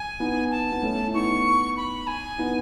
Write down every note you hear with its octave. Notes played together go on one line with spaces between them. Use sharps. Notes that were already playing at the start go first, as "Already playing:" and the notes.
Already playing: G#5
B3 D#4
A5
B3
A3 C#4
E4
B3 D#4 C#6
B5
G#5
B3 D#4